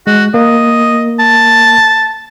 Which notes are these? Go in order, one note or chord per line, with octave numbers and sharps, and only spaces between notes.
G#3 F#4
A#3 A#4 D#5
A5